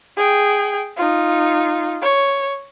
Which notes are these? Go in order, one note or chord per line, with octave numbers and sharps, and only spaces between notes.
G#4 G5
D#4 F4
C#5